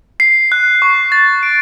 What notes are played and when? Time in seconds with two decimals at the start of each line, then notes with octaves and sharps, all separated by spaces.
0.20 C7
0.52 F#6
0.82 C#6
1.12 A6
1.43 D7